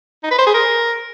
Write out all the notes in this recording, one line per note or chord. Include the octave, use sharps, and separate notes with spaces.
D#4
B4
C5
G#4
A#4